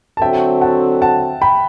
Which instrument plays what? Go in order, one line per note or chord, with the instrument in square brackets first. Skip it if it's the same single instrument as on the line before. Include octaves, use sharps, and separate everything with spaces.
[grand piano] A5
[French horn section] D3 F#3 C4 F#4 A4 [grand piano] E5 G5
[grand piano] F#5 A5
F#5 A5
G5 B5